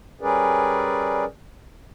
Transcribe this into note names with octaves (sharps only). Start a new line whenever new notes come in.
G3 C#4 G#4 A#4 B4 D5